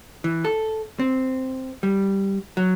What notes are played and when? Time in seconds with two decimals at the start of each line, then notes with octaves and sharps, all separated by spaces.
0.24 E3
0.45 A4
0.99 C4
1.83 G3
2.57 F#3